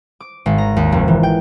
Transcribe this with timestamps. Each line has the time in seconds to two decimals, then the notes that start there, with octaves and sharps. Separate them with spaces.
0.20 D6
0.46 G#1
0.58 A#5
0.76 D#2
0.92 F1
1.08 E3
1.23 G5